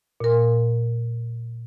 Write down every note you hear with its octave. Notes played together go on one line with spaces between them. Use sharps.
A#2 A#4